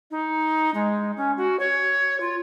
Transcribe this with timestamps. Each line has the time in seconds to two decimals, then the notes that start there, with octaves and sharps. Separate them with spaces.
0.11 D#4
0.74 G#3
1.17 C#4
1.37 F#4
1.59 C#5
2.20 F4